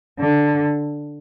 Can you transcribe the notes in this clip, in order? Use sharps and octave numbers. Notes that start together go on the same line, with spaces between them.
D3